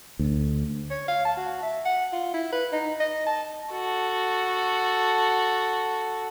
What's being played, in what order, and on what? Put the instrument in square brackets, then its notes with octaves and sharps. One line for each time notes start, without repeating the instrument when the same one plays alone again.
[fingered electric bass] D2
[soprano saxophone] C#5
F5
A5
F#4
E5
F#5
F4
E4
B4
D#4
D#5
A5
[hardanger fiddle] F#4 A4